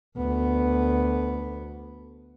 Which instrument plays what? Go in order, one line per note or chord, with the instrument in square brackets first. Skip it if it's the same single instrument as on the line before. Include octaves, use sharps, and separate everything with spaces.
[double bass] D2 B3